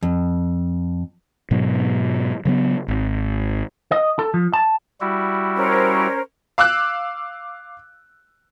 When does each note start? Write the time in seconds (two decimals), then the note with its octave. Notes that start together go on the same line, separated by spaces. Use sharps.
0.03 F2
1.51 G#2 B2 F#3
2.45 C#3 F#3 G3 B3
2.88 G#1
3.92 D#5
4.19 A4
4.34 F3
4.53 A5
5.01 G3 E4 F#4
5.56 C#4 A#4 C5
6.58 F5 D6 E6 F#6